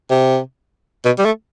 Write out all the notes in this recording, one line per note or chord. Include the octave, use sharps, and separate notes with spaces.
C3
B2
G3
A3